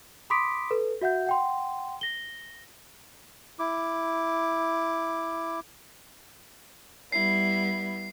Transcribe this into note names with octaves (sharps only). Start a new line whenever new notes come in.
B5 C6 D6 D#6 B6 D7
A4 B4
F#4 E5 F#5 G6
F#5 G5 C6
A#6 G7
E4 D6
G3 B3 E4 C7